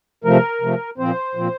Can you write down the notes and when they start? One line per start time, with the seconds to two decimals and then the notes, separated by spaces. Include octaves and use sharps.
0.24 C3 F3 A3 A#4
0.62 C3 F3 A3
0.98 A#2 F3 C4 C5
1.35 A#2 F3 C4